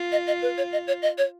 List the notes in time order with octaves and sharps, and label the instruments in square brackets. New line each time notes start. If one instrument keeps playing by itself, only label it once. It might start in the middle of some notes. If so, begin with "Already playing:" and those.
Already playing: [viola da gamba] F4
[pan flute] D#5
D#5
B4
C#5
D#5
C#5
D#5
C#5